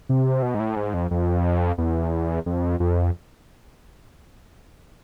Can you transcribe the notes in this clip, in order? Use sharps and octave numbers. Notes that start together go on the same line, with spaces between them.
C3
B2
G#2
A2
G#2
F2
F2
E2
F2
F2